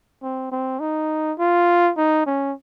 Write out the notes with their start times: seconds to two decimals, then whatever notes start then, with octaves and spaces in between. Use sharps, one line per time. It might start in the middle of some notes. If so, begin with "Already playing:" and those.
0.23 C4
0.52 C4
0.80 D#4
1.39 F4
1.97 D#4
2.26 C#4